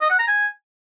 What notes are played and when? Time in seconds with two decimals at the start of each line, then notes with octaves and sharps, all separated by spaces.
0.01 D#5
0.10 F#5
0.19 A#5
0.28 G#5